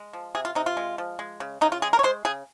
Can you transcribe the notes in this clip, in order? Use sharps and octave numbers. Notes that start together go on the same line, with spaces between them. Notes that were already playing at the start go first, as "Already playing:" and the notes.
Already playing: G#3
F3
C3 G#4
F4
C3 D#4
F4
G#3
F3
G#3
C#3
C#3 D#4
F4
G#3 G#4
A#4
C#5
G#3 C5
C#3 G#4